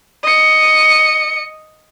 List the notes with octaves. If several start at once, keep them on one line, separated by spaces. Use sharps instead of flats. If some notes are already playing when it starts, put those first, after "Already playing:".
D#5 C#7